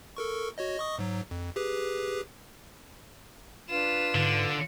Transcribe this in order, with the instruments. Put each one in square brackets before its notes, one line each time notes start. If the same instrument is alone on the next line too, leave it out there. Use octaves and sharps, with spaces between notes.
[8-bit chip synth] A4 A#4 C#6
F#4 C#5 D#5
D#5 C#6 D#6
G#2 F#3
F2
G4 G#4 B4
[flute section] D4 B4 [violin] F4 E7
[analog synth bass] G#2 [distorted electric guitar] D3